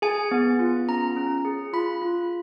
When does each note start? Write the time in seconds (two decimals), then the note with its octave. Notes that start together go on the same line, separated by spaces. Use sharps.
0.02 G#4 G#5
0.31 B3
0.59 F4
0.88 C#4 A#5
1.16 C#4
1.45 G#4
1.73 F4 B5
2.02 F4